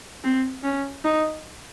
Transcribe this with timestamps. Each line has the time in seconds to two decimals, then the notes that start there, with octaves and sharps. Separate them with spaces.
0.24 C4
0.63 C#4
1.04 D#4